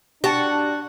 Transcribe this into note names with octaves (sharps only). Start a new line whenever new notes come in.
D4 F#4 G4 A5 C#7